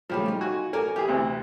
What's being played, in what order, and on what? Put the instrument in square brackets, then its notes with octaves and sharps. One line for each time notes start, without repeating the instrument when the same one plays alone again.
[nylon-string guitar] A#2 C#3 A3 [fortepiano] F3 G3
[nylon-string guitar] D#4 F4
[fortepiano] F#4 G#5
[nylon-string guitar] F#4 A4 D5 [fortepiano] A#4 G#5
[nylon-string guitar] E3 [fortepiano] G4 G#4
[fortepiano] D2 C3